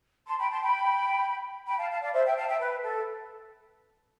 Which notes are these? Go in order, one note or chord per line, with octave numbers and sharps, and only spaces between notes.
A5 C6
G5 B5
A5 C6
G5 B5
G5 B5
F5 A5
F5 A5
D5 F5
C5 E5
E5 G5
F5 A5
E5 G5
B4
A4